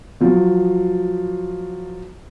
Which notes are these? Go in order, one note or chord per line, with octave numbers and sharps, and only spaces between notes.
F3 F#3